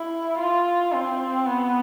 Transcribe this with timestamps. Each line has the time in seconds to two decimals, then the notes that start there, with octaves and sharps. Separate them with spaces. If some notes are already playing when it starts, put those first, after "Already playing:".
Already playing: E4
0.39 F4
0.93 C4
1.47 B3